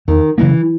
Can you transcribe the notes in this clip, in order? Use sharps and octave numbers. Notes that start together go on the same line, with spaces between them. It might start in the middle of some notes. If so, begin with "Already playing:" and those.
E2 D#3
C#3 E3 F#3 A#3